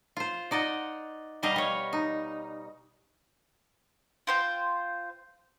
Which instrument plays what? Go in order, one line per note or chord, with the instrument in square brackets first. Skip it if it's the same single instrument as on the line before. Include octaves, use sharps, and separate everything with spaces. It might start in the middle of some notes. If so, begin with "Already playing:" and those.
[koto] F4 C5
D#4 D5 D#5 F#5
B2 G3 G4 D#5 F5 A#5
G3 C#5
D#4
[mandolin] F4 C5 G5